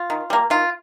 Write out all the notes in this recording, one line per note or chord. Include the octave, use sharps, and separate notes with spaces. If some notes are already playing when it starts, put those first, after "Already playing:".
Already playing: F4
D#3
G3 A#3
D#3 F4